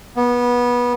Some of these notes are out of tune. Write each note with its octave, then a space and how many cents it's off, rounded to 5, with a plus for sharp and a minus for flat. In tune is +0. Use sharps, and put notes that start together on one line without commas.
B3 -20